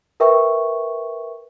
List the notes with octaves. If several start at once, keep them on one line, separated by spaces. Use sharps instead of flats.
A#4 B4 E5 G5 C#6